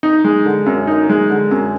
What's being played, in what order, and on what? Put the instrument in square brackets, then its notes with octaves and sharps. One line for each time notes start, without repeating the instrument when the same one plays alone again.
[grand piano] D#4
G#3
D3
F#2
D#4
G#3
D3
F#2